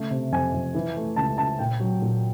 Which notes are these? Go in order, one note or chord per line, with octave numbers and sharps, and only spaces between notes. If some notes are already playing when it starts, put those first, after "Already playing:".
Already playing: C#3 A3
C3
F2 G#5
F2
E3
A3
C#2 A5
C#2 A5
A#2 G5
F#3
A#2